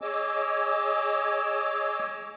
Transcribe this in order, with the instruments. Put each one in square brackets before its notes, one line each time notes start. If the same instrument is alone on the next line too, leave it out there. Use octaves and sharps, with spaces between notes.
[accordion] G#4 C#5 D#5 G#5 D6 E6